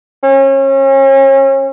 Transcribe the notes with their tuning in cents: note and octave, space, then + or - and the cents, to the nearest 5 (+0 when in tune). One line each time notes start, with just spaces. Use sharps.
C#4 -35